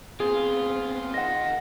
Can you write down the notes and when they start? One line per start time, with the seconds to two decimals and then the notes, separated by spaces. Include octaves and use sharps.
0.20 B3 C4 F4 G#4
1.14 A#4 D#5 F#5 A#6